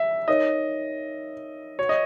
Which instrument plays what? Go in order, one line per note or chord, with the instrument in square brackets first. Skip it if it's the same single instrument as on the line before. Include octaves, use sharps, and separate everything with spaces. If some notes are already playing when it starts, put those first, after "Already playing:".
Already playing: [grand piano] E5
[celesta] D#4 A#4 C#5 [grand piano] D#5
[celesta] F#4 B4 F#5 [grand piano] C#5
[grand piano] D#5